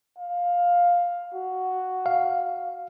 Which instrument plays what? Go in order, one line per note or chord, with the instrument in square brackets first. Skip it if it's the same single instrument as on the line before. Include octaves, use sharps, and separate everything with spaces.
[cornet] F5
F#4
[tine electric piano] F5